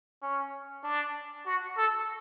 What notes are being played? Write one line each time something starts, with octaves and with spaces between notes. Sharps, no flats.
C#4
D4
F#4
A4